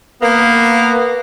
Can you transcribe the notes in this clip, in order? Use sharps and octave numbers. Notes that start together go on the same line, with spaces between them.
A#3 B3